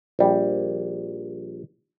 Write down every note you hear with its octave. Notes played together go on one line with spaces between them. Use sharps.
A#1 G3